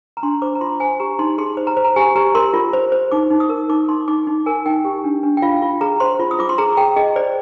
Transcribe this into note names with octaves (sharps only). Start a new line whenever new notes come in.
A#5
D4 C6
C5 D6
A#5
F4 C6
C5 G#5
G4 A#5
D#4 C6
G#4 C6
C5
A#5
C5
A#5
G4 G#5
G4 A#5
A#4 C6
F4
C5
C5
D#4 D6
D#4
D#6
A#4
D#4 D6
D#4 C6
D#4 D6
D#4
A#4 G#5
D#4 G5
G4
D4
D4
G5
F4 F5
F4
G#4 A#5
C5 C6
F4
D#6
F4 D6
C6
G#4 A#5
G#4 G5
G#4 D#5
C5 D5